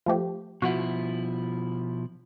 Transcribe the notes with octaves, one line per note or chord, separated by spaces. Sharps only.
F3 A3 G4
B2 F3 E4 F#4